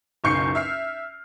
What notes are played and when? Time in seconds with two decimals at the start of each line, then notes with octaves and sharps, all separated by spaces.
0.24 F#1 B1 C#6 G6 C7 C#7
0.55 E5 F6 C7